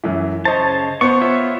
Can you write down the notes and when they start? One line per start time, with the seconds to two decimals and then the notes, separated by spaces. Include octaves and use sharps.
0.04 F#2 E3
0.45 C#3 C5 C#5 D#5 A5
1.01 B3 C5 C#6
1.21 F4 C#5 E5